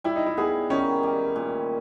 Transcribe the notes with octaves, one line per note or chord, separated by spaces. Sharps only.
G3 E4
D#4
E4
B3 G#4
D#3 C#4
G3
A#2